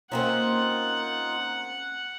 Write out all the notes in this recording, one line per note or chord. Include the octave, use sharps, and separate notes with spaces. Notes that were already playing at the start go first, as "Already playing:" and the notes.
A#3 C4 C#4 D#4 F4 F#5